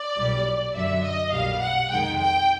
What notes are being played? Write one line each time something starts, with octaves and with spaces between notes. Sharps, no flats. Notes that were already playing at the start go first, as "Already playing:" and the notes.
Already playing: D5
B1 A#2 G3
F#2 D3 F#3 E5
D#5
B1 A#2 G3 F5
F#5
F2 C3 D#3 G#3 G5
G5